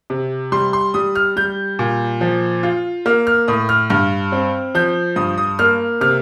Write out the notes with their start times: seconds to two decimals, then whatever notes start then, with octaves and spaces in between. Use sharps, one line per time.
0.10 C3
0.52 G3 C6
0.73 C6
0.94 G3 D#6
1.16 F6
1.36 G3 G6
1.79 A#2
2.21 F3
2.63 F4
3.06 A#3 F6
3.27 F6
3.48 A2 D#6
3.69 F6
3.90 G2 F6
4.32 C4
4.75 F3 G6
5.16 G2 D#6
5.38 D#6
5.59 A#3 F6
6.01 C3 F6